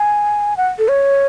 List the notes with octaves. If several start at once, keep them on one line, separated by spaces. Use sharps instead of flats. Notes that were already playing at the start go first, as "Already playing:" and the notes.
Already playing: G#5
F#5
A4
C#5